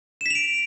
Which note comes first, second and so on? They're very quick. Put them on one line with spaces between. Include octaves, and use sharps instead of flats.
E7 B6 F7 D7